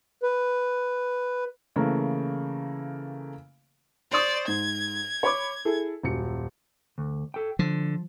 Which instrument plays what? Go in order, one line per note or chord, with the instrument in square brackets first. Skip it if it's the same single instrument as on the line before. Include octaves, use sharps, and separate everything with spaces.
[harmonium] B4
[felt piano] C#3 E3 A3 A#3
[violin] C5 D5 [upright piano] C6 C#6 D#6
[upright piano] G#2 [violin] G#6
[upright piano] C#5 B5 D6
E4 G#4 A4
D#1 F#2 C#7
[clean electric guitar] D2
A4 G5
[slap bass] D3 [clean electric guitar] F3